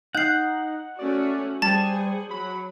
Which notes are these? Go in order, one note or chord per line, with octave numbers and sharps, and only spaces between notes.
D#4 F#5 G6 C7
A3 C#4 F#4 D5
G3 G#4 C5 G#5 A5 A6
F#3 B5